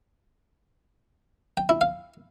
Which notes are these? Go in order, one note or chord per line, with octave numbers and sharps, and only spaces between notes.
G5
E4
F5